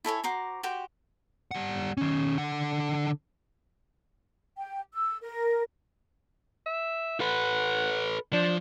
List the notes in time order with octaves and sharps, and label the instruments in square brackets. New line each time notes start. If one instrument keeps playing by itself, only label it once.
[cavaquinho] E4 A4 C#5 G#5
F#4 C5 A#5 D6
F#4 G4 C5 G5
[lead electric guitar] G3 F#5
D#3 C#4
D3 F#5
[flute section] G5
E6
A#4
[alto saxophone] E5
[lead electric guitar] A4 B4 [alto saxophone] F#5
[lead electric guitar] F3 [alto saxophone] D4